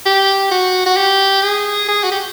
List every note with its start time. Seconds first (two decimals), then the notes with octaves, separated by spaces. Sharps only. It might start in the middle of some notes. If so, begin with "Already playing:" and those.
0.06 G4
0.51 F#4
0.86 F#4
0.96 G4
1.42 G#4
1.88 G#4
2.03 F#4
2.11 G4